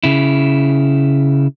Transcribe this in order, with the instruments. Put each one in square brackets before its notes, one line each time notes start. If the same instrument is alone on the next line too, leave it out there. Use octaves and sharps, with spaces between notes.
[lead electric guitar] C#3 E4